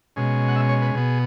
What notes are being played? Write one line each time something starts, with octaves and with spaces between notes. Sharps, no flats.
B2 G#3 C#4
F#5
E5
C#5
B4
B2 B3 G#4